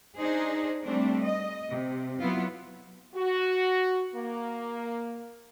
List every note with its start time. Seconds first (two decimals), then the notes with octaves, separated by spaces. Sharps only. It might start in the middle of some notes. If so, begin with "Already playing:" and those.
0.18 D4 D#4 G#4 C5
0.84 G3 A3 C4 D4
1.22 D#5
1.69 C3
2.18 F#3 B3 E4 F4
3.15 F#4
4.15 A#3